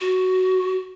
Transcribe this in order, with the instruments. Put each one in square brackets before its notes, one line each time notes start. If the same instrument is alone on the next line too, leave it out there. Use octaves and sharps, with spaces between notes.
[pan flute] F#4